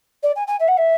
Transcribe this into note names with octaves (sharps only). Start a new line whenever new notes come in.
D5
G#5
G#5
E5
F#5
E5